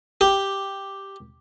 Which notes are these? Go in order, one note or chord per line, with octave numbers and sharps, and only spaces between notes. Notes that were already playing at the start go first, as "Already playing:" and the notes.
G4